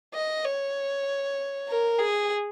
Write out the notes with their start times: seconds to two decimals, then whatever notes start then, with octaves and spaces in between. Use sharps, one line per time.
0.14 D#5
0.45 C#5
1.68 A#4
1.99 G#4